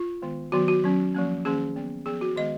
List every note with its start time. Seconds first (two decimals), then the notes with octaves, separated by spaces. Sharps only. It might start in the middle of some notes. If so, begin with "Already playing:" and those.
Already playing: F4
0.22 D#3 G#3 B3
0.52 D#3 F#3 B3 F#4
0.68 F#4
0.84 F#3 C#4
1.14 F3 A#3 C#4
1.45 D#3 A#3 C#4 G#4
1.76 F#3 B3
2.06 F3 B3 G#4
2.21 F#4
2.37 D#3 G#3 B3 D#5